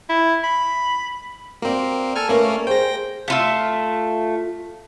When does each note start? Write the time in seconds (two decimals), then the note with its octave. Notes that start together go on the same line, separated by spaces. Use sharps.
0.09 E4
0.44 B5
1.62 A#3 C4 F#4 D5
2.16 A4 G#5 F6
2.29 A3 A#3 C#4 A#4 B4 D5
2.67 G#4 C5 G5 A#6
3.28 A3 F4 E5